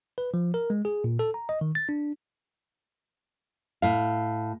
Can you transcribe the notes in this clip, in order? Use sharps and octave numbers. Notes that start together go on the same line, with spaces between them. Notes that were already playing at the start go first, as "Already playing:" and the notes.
B4
F3
A#4
G#3
G#4
A#2
A4
A#5
D#5
D#3
A6
D4
A2 F5